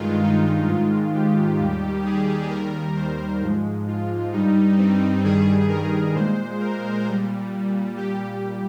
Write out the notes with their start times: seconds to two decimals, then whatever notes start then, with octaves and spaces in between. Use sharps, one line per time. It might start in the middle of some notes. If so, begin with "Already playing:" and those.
Already playing: G2 D#3 G#3 F4
0.23 D#4
0.68 G#2 D#3 G#3 F4
1.15 G4
1.60 D#2 D#3 G3
2.06 G#4
2.50 D#2 D#3 G3 A#4
2.97 C5
3.41 G#2 F3 G#3
3.88 F4
4.33 G2 G3 D#4
4.78 C4
5.24 G2 D#3 G3 G#4
5.69 A#4
6.14 A#2 G#3 C5
6.61 A#4
7.07 A#2 G3
7.97 A#2 G3 G4